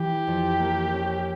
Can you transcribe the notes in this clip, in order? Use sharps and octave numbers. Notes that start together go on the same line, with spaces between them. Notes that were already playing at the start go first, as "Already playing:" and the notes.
Already playing: E3 G4
F2
A#3
C#4